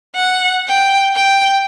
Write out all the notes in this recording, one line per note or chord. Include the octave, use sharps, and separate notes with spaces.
F#5
G5
G5